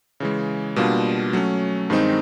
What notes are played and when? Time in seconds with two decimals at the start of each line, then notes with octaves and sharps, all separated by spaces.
0.20 C#3 E3 G#3
0.76 B2 G3 A#3 D4 F4
1.33 F#3 A3 C#4
1.90 G2 D#3 G#3 C4 D#4